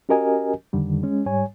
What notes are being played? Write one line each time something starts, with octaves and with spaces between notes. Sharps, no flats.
C#4 F#4 G4 A#4 D#5 G#5
F2 D3 D#3 G3
G#3 C#4
G#2 G3 C#5 G#5